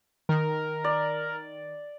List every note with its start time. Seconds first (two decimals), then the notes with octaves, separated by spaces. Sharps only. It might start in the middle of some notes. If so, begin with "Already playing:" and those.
0.29 D#3 A#4
0.84 D5